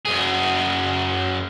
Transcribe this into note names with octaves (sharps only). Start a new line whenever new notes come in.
F#2 G#4